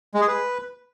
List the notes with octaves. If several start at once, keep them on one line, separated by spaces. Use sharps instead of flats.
G#3
G#4
B4